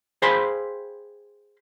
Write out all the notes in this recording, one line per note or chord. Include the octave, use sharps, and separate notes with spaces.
G#4 C5 F5 G5 B5 C6